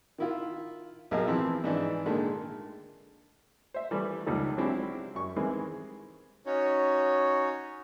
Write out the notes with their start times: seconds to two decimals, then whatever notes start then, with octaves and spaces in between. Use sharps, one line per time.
0.18 D#3 E4 F4
1.11 B1 A2 G#4 A#4 D#5
1.28 E3 F3 C4
1.64 G#2 E3 D4 D#4
2.06 A#2 D3 D#3 G#3 A3
3.74 C5 E5
3.91 E3 G3 A3
4.26 C#2 F3 G3 D#4 A4
4.57 F#3 G#3 C4 D4 E4 G4
5.15 F#2 C#6
5.36 D#3 E3 G3 G#3 C4 E4
6.46 C#4 D#4 F#4 C#5